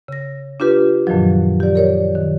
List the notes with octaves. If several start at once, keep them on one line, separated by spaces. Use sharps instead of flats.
C#3 A#6
D4 F4 G4 B4
F#2 A#2 D#3 F3 F#3
G4 D5
A#4 C#5 D5
D#3